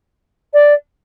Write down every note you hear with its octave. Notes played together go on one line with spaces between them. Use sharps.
D5